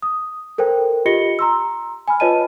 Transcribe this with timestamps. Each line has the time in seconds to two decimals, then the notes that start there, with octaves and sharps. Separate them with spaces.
0.02 D#6
0.58 A4 A#4 C5 G5
1.06 F4 G4 D#5 A#6 C#7 G7
1.39 A#5 C6 E6
2.08 G#5 B5 F6
2.20 F4 B4 C#5 D#5 A5 D#7